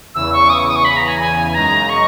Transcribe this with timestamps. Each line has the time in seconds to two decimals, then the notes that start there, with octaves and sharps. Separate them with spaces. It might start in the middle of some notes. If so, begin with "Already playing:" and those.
0.15 E2 C#3 E3 E6
0.33 C#6
0.50 D#6
0.59 C#6
0.68 D#6
0.76 C#6
0.85 B5
0.97 A#5
1.08 G#5
1.20 G#5
1.54 F#2 C#3 G#3 D#4 A#5
1.89 C#6